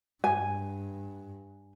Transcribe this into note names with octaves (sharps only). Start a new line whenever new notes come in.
G2 G#5